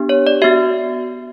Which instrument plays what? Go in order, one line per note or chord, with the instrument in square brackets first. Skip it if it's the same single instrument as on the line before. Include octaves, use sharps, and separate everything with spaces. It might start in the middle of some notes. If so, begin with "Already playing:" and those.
Already playing: [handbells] B3 D4 G4
C#5
D5
B3 F#4 E5